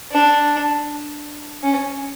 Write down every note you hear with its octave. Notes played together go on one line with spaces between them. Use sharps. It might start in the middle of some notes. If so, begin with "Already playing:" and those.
D4
C#4